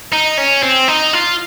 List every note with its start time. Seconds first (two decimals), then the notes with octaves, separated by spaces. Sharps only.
0.12 D#4
0.38 C#4
0.63 C4
0.88 D#4
1.13 F4